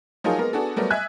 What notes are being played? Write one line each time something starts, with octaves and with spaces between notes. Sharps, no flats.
F3 F#3 D#4 F4 G#4 A#4
G#3 A#3 B3 A#4
B3 D4 F#4 G#4 A4
F#3 G3 A3 B3 A#4
D#5 E5 G#5 E6 F#6 G#6